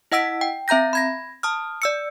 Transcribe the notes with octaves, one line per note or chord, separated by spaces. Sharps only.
E4 D#5 F#5 E6 B6 D7
G5
C4 E5 A#5 G6 A#6
B5 G#6 A#6
A5 D#6 F6
D5 E6 C#7